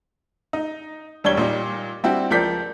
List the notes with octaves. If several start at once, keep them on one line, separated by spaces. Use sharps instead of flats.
D#4
E1 G3 D4 C#5 G#6 G7
A#2 G3 D#4
G3 C4 D4 E4 F#4 G4
C#2 F3 A#4 D5 G6 B6